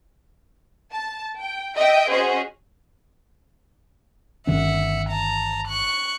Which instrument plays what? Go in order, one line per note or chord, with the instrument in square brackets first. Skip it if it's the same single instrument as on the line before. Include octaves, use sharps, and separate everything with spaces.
[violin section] A5
G5
D#5 E5 G5
C#4 F#4 G#4 C5 D#5
[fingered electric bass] G1 D#3 C#4 [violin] E5 F#5
[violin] A5 A#5
C#6 F#6